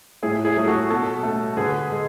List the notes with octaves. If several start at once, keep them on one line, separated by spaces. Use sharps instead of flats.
A2 E4 G#4
E4 G#4
F#3 A3 G#4
F#4 A4
B2 F#4 A4
A3
D3 G#4 B4
G#3